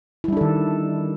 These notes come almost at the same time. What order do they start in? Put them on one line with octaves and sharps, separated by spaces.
E4 G3 D4 A4 D#3